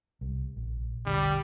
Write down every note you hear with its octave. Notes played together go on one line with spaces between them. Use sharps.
C2
A#1
E1 A#1 D3 G3